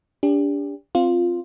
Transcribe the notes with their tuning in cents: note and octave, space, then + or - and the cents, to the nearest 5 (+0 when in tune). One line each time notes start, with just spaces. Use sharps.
D4 -30 G4 +30
C4 +0 F4 +0